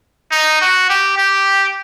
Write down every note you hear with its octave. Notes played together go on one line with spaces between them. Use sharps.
D#4
F#4
G4
G4